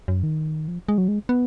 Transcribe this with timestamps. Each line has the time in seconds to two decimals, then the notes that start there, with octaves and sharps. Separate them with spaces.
0.08 F#2
0.23 D#3
0.68 F3
0.89 G#3
0.98 F#3
1.08 G#3
1.29 B3